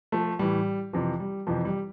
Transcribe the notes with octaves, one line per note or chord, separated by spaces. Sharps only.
F3 A3
A2 E3 G3
F2 C3 E3 F3
G3
F2 C3 E3 F3
G3